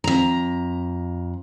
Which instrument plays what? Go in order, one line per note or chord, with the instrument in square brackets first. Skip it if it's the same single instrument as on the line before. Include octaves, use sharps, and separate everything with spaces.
[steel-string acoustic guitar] F2 A#5